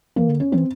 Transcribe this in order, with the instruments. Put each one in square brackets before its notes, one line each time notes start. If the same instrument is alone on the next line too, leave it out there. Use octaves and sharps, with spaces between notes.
[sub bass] E3 [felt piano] A#3
[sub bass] D3
[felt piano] C#4
[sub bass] E3 [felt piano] C4